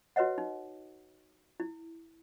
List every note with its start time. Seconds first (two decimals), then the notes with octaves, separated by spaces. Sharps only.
0.16 F#4 B4 C#5 D#5 F#5
0.38 D#4
1.60 E4